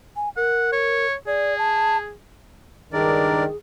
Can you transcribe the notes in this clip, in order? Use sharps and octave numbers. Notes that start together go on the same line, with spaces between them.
G#5
A#4 F#5
C#5
G#4 D5
A5
C#2 G2 D#3 D4 G#4 A#4 D5